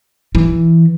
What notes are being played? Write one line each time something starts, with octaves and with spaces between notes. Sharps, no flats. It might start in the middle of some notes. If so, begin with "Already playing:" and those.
E3